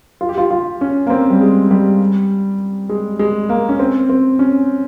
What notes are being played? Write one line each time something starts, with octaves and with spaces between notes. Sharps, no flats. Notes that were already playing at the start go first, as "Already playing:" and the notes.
F4
G4
F4
F4
C#4
A#3
C4
G3
G#3
G3
G#3
G#3
A#3
C#4
C4
C4
C#4